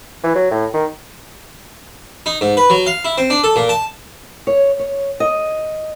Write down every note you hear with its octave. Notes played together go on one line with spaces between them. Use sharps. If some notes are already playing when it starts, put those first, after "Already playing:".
E3
F#3
A2
D#3
D#4
G#2
B4
F#3
F5
E4
C4
D4
A4
A#2
A5
C#5
C#5
D#5